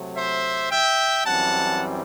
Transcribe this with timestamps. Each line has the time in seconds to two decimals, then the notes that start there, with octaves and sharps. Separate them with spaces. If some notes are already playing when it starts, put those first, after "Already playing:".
Already playing: C3 F#3 A3
0.16 C5 E5
0.71 E5 G5
1.26 F#2 E3 G3 C4 F#5 A5